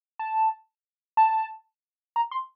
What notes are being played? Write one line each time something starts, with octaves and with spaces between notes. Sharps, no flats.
A5
A5
A#5
C6